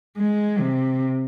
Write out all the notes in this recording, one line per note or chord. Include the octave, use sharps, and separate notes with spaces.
G#3
C3